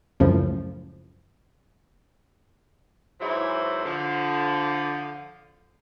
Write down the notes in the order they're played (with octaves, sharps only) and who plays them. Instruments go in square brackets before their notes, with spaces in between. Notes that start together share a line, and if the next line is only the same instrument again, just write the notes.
[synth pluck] C#2 F#2 A2 C#3 F3
[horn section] G#2 E3 F#3 E4 C5 D5
D3 F3